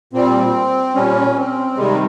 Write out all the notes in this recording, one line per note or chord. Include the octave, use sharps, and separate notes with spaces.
A#2 G3 C4
A#2 G3 C#4
C4
C3 D#3 G3 G#3